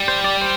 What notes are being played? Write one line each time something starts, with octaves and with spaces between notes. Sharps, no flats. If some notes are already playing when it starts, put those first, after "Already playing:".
Already playing: G3
C5
D5
C5